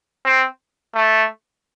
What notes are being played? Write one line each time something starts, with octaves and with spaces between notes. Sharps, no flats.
C4
A3